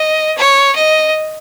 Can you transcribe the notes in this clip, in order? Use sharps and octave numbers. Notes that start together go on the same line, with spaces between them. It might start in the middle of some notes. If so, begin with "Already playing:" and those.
Already playing: D#5
C#5
D#5